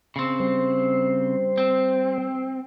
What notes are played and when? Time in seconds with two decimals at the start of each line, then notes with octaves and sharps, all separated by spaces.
0.16 C#3 C4
0.40 G3 C5
1.58 C4